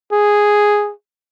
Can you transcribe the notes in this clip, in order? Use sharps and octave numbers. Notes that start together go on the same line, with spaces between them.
G#4